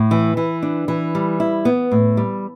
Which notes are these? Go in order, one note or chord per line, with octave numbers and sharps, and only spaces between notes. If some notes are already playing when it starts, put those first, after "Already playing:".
Already playing: A2
E3
E3
D4
E3
G3
E4
B3
A2
G3